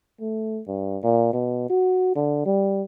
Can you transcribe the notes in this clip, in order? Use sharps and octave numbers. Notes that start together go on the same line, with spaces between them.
A3
G2
A#2
B2
F#4
D3
G3